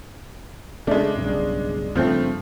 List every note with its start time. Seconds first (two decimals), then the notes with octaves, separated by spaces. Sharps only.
0.87 C#3 G#3 A3 D4
1.16 B1 G2 C#3
1.95 G2 C#3 F3 A3 C4